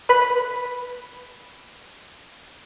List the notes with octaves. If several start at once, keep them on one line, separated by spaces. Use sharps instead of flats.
B4 B5